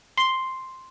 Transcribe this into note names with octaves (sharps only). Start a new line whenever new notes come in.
C6 C7 G7